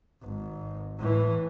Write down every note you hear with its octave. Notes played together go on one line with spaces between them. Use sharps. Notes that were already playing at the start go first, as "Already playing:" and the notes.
G#1
A2 E3